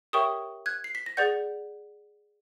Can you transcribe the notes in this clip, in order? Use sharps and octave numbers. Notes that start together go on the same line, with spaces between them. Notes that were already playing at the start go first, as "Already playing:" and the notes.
G4 A#4 C#5 E5 G5 C#6 D#6
F#6 G#6
C7
B6
A#6
G#4 B4 D5 F#5 G6 A6